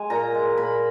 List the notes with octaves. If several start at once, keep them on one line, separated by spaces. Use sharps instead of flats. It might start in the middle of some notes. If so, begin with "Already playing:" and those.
Already playing: G#3 G#5
A#2 A#5
G#3
A#2 B5